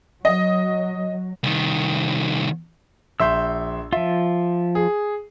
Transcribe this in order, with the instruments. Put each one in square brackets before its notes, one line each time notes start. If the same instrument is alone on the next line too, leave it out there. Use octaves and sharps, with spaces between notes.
[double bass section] F#3 [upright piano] D#5
[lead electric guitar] C2 D#3
[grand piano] A#1 E5 C6 [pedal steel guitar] E6 G6
[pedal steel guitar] F3 F4 [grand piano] E5
[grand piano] G#4